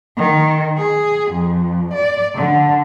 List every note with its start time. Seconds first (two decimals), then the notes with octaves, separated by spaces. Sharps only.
0.17 D#3
0.78 G#4
1.31 F2
1.93 D5
2.35 D3